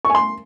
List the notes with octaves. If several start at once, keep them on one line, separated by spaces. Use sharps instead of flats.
C#6
G#5
C6